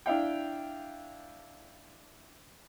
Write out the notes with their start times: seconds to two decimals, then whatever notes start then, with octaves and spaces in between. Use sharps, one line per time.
0.06 D4 E4 F5 G5